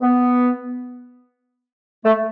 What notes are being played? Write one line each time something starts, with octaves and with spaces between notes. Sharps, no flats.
B3
A3